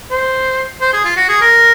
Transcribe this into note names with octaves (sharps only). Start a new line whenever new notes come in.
C5
C5
G#4
F4
F#4
G#4
A#4